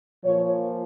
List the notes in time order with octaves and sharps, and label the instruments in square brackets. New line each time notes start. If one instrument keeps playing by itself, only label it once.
[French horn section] A#2 F3 C#5